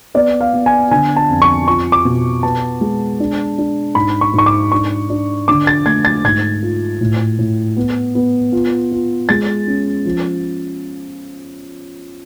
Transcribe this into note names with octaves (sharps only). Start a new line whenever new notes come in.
B3 D5
F5
B3
G#5
D3 G#5
A5
F2
C#6
F4 C#6
D6
B2
B3 A5
G#3
D4
D4
G#2 B5
C#6
G#2 C#6
D6
D4 C#6
D4
D3 D6
A6
A3 G#6
A6
G#2 G#6
F4
A2
A2
B3
B3
F4
F4
G#3 A6
C#4
F3